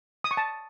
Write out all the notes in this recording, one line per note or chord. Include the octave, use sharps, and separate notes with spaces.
D#6
C#6
A5